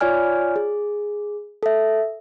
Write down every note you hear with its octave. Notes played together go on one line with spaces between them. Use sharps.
F4 C#5 D5 G#5 F6
G#4
A4 E5